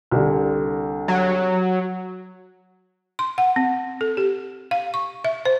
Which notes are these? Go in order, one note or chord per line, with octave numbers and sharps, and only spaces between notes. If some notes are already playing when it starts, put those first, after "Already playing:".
C2 D3
F#3
C6
F#5
C4
A4
G4
F5
C#6
E5
C5